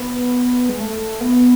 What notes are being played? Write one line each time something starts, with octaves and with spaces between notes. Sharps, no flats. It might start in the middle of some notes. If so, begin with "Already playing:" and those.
Already playing: B3
G#3
A3
B3